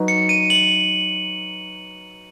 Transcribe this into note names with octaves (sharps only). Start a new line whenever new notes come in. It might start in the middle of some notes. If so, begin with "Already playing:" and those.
Already playing: F#3 D#4 F#4 B4
C#7
D#7
F#7